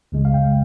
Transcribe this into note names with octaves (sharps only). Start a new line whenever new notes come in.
C#2 C#3 G#3
F5
G5